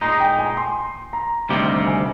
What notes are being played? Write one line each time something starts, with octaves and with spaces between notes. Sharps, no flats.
A#2 G#3 D#4 A#5
G5
G#5
C6
A#5
D2 C3 D#3 G3 A#3
G#5